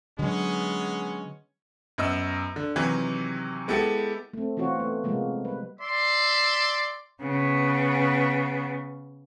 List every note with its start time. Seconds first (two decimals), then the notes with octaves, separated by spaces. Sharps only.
0.19 D3 F#3 G#3 B3 C#4
1.98 F#2 B3 D#5 E6
2.56 D3
2.76 C3 D#3 E3 F#3
3.68 G#3 B3 E4 G4 A4
4.33 A3 C4
4.57 E3 C4 F4 F#4 C#5
4.75 A3 B3
5.04 C3 F3 G#3 A#3 B3
5.45 G3 B4
5.80 D5 E5 C6
7.23 C#3 B3